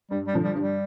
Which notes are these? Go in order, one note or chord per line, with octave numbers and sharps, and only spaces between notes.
G2 G3
G3
D3 F3
G3
G2
G3